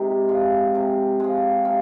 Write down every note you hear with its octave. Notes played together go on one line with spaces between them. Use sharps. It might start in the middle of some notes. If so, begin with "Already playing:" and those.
Already playing: C3 G#3 D#4 G4
F3 G#3
C3
F3 G#3
C3 F4